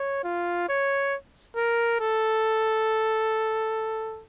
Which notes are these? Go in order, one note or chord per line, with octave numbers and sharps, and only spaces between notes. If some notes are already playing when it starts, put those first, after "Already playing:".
Already playing: C#5
F4
C#5
A#4
A4